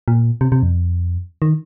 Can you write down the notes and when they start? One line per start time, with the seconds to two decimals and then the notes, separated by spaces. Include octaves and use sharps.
0.08 A#2
0.41 C3
0.52 C3
0.63 F2
1.42 D#3